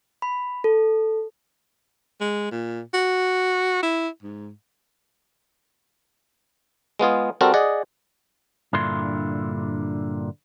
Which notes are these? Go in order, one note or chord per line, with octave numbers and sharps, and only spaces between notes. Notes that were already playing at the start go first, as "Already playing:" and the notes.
B5
A4
G#3
A#2
F#4
E4
G#2
G#3 B3 F4 G#4
G3 C4 F#4 A4 A#4
G#4 D5 D#5 F#5
G2 A#2 D3 E4 C6